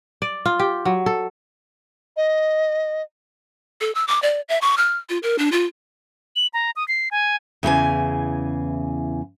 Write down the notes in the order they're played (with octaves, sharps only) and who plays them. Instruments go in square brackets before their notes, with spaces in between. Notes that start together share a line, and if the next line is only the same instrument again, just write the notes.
[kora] D5
F4
G4
F#3
A4
[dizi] D#5
[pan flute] A4
E6
D6
D5
E5
C#6
F6
F4
A#4
D4
F4
[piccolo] F#7
A#5
D#6
C7
G#5
[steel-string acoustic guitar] E2 C#3 E3 G#5